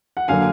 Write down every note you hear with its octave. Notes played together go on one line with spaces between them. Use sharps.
F#5
D3 F#3 A#3 F5 G#5